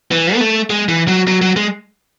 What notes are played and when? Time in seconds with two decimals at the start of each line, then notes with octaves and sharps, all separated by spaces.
0.11 E3
0.35 B3
0.41 A3
0.70 G#3
0.88 E3
1.08 F#3
1.27 F#3
1.42 F#3
1.56 G#3